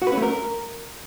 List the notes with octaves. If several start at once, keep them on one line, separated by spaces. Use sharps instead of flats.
F#4
B4
C#4
A3
A#4